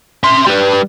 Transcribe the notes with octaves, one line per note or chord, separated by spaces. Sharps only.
E5 C6
G3 B4